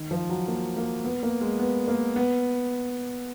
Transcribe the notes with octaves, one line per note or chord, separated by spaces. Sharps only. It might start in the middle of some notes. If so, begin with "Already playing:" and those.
Already playing: D#3
F3
F#3
A#3
A#3
B3
A#3
G#3
B3
A#3
B3